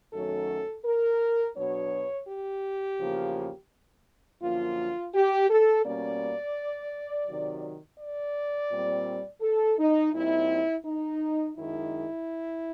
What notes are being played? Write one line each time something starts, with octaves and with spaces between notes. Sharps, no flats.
F#2 D#3 F#3 A3 C#4 A4
A#4
B2 F#3 B3 D4 C#5
G4
E2 C#3 F3 A#3
F#2 D3 F3 A#3 F4
G4
A4
B2 G3 A#3 C#4 D5
C3 D#3 F#3
D5
A#2 G3 C4
A4
D#4
A#2 G3 C4 D#4 E4
D#4
F#2 D#3 G#3 E4